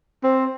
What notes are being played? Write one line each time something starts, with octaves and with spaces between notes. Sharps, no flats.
C4